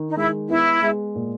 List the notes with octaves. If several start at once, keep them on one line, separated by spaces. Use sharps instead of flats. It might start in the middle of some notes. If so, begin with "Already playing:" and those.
Already playing: D#3
D#4
G#3 E4
B3 E4
G#3
A#2